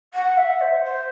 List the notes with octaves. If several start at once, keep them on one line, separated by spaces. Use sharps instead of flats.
F#5
E5
C5
C5